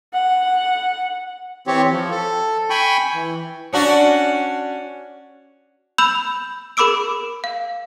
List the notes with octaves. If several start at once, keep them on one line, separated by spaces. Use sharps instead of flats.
F#5
E3 C4 G4 C#5
F3
A4
G5 G#5 B5 C#6
E3
C#4 D4 F#4
B5 E6 G6 F7 F#7
G#4 A#4 B5 D6 E6 D7
F5